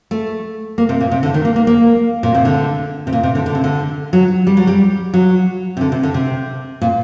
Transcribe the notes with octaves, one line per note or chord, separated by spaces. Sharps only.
A3
A#3
C3
A#2
C3
D3
D#3
A#3
A#3
A#3
A#2
C3
D3
C3
A#2
C3
D3
D3
C3
D3
F#3
G3
F#3
G3
F#3
C3
D3
C3
D3
C3
A#2